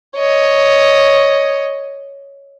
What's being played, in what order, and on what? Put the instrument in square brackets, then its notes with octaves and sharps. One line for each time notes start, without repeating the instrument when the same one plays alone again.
[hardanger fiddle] C#5 D#5